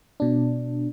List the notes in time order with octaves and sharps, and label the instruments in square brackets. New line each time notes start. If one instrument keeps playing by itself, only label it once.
[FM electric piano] B2 D4